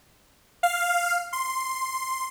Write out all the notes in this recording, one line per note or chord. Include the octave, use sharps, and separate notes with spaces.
F5
C6